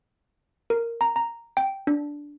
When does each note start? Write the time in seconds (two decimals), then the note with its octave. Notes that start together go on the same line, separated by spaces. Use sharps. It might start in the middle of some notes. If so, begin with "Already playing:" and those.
0.70 A#4
1.01 A#5
1.16 A#5
1.57 G5
1.87 D4